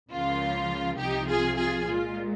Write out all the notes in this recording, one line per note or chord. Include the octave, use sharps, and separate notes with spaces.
C#2 C#3 F3 A#3 F4
C2 C3 F3 D#4 G4
F4 G#4
F4 G#4
A#2 G#3 F4